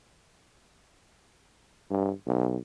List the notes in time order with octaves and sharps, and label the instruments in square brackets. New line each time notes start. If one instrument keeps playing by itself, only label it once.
[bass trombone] G2
B1